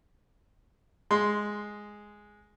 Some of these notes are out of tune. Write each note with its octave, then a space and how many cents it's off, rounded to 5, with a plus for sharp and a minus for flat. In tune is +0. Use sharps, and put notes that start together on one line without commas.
G#3 +0 C6 +0